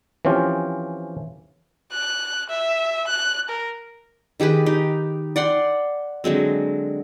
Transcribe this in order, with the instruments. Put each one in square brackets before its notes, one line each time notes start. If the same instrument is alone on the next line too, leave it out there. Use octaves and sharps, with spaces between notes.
[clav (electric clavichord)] E3 F3 C4 C#4 F4 G4
[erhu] F#6
E5
F#6
A#4
[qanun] D#3 G4 G#4 B4
D#4 G4
D5 F#5 G5 C6
D3 F#3 G#3 C4